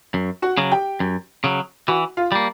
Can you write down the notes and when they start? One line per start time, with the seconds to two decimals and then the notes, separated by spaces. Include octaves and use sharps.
0.14 F#2
0.42 F#4 F#5
0.58 C#3 F#3
0.72 G4 G5
1.00 F#2
1.44 C#3 F#3
1.88 E3 F#4 F#5
2.17 F4 F5
2.32 G3 A#3